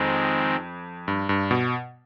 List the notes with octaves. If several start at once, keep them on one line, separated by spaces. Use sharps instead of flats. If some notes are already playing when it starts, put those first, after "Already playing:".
Already playing: F2 D#3 G#3 C4
G2
G2
B2